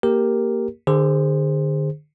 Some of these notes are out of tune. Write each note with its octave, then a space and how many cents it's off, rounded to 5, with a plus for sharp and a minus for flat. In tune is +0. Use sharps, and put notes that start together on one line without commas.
A#3 -5 G4 +0 A#4 +0
D3 +35 G#4 -30 C5 +0